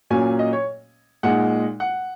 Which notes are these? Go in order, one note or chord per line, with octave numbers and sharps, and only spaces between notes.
A#2 F#3 C#4 G#5
D#5
C#5
A#2 G#3 D#4 F#5
F#5